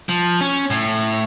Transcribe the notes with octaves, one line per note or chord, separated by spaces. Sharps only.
F3
C#4
A2